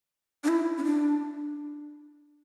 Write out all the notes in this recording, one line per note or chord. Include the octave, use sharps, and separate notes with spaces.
D4
E4
C#4
D4